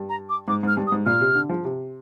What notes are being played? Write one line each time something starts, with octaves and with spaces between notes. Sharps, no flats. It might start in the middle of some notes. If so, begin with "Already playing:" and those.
Already playing: G2
A#5
D6
G#2 D6
G#2 F6
G2
D#6
G#2
A#2 F6
C3
D3
F3
C3